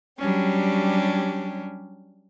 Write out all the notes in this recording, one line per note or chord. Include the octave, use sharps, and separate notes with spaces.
F#3 G3 C#4 D4 G4